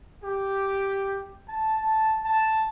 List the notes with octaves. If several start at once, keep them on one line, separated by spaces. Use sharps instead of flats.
G4
A5
A5